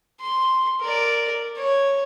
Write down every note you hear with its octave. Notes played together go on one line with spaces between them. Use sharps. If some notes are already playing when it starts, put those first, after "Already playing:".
C6
A#4 D5
C#5